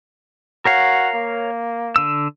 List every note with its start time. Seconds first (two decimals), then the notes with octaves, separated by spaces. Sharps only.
0.65 F#4 A#4 C#5 F5
1.15 A#3
1.96 D3 E6